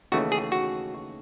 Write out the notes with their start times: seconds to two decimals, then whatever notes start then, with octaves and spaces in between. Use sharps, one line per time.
0.12 D#2 C#3 E3 A3 F#4
0.32 G#4
0.52 F#4